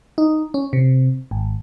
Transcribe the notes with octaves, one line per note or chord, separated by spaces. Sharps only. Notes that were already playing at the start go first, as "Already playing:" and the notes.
D#4
C#4
C3
G#1